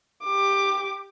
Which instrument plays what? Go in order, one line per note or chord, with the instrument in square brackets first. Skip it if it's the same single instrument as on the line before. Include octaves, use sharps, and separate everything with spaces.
[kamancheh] G4 D6